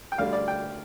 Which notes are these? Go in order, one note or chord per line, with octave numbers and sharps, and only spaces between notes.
G5
D2 D3 G3 F5
D5
G5